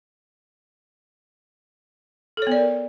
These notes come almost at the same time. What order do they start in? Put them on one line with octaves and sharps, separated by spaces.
A4 C#5 B3 D5 A#4